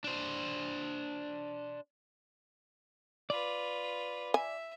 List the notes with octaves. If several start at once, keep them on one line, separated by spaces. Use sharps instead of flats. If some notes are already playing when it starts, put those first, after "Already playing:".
D4 C5
F4 B4 D5
E5 G#5